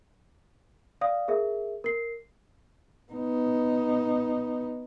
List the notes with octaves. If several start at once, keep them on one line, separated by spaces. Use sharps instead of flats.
D5 F5 D#6
G#4 A#4 E5
A#4 C7
B3 D#4